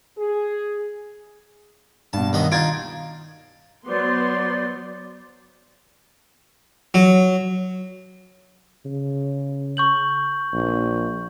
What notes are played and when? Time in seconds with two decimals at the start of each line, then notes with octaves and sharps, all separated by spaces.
0.18 G#4
2.13 G2 B2 A5
2.33 D#2 B3 D#5
2.52 D#4 F4 G#6 A6 D7
3.86 F#3 B3 C5 D5 C6 D6
6.94 F#3
8.86 C#3
9.77 C#6 G6 F#7
10.53 A#1